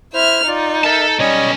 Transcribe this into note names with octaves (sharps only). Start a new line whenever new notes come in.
E4 C5 E5 F6
D#4 F4 D5
A4 A#4 E5 A5
B1 G3 C#4 C#5 D#5